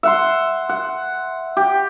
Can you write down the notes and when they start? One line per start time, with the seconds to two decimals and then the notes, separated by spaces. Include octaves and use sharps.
0.03 E5 F#5 C6
0.69 F#5
1.57 G4